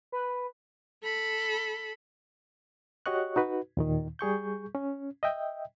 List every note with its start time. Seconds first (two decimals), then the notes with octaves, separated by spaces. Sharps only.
0.12 B4
1.03 A4 B5
3.06 F#4 G4 C#5 D#5 C#6 F#6
3.36 D#4 F#4 B4
3.77 D#2 A#2 D#3
4.19 G3 G#4 C#6 G6
4.75 C#4
5.23 D#5 E5 G5